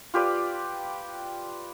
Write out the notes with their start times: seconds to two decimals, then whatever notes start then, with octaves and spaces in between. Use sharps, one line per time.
0.14 F4 G4 B4 D5